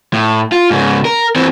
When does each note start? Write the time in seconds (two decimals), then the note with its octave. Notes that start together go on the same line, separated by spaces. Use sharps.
0.13 A2
0.52 F4
0.70 G#2 C#3
1.05 A#4
1.36 E3 C4